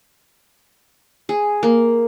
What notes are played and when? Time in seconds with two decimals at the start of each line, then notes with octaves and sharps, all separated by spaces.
1.29 G#4
1.63 A#3